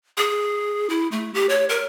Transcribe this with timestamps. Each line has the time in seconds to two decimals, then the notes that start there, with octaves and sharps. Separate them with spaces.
0.17 G#4
0.90 E4
1.12 A3
1.34 G4
1.49 C#5
1.69 A#4